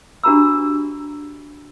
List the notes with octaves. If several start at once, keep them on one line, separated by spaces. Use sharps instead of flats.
D4 F#4 G4 A#5 B5 E6